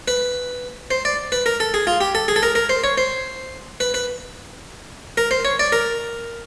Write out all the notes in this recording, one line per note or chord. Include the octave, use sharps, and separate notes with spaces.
B4
C5
D5
B4
A#4
A4
G#4
F4
G4
A4
G#4
A4
A#4
A#4
C5
C#5
C5
B4
B4
A#4
C5
C#5
D5
A#4